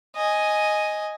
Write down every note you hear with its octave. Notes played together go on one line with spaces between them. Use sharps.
D#5 G#5